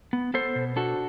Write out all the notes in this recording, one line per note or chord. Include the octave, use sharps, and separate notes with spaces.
B3
B3 A4 C5
B2
D4 F#4 A4